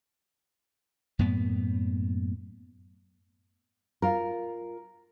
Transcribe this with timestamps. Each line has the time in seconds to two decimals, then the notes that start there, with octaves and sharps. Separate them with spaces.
1.19 F#2 A2 A#3 B3
4.02 F4 A#4